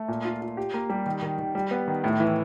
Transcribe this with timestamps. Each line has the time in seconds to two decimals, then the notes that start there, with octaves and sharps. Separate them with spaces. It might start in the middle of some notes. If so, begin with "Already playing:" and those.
Already playing: A3
0.08 A#2
0.25 F4
0.41 F4
0.57 G4
0.74 A#3
0.90 G3
1.06 D#3
1.22 D#3
1.39 D#3
1.55 G3
1.71 B3
1.88 D#3
2.04 A2
2.20 E3